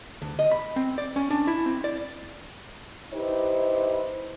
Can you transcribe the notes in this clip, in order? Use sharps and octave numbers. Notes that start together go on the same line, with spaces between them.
D2
D#5
B5
C4
D5
C#4
D4
E4
C4
D5
D#4 E4 G4 B4 C5